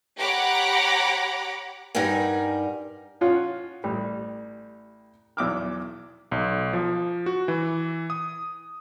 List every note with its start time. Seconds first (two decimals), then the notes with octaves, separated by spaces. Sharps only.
0.17 G4 C#5 F#5 A#5 B5 D6
1.95 G2 G3 D#4 A#4 F#5 G#5
3.21 F3 C#4 F4 F#5
3.84 A1 G3
5.37 B1 E2 E5 D6 E6 F6
6.32 B1
6.73 F3
7.26 F#4
7.48 E3
8.10 D#6